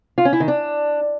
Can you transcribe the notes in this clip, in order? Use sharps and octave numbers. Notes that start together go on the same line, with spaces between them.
F4
C#4
E4
D#3
D4